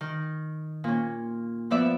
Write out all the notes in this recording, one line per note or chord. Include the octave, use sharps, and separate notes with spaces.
D#3
A#2 C#4
F3 B3 D5 E5